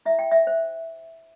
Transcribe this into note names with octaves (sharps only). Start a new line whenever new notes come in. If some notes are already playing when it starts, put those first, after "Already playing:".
E4 E5
G5
E5
C5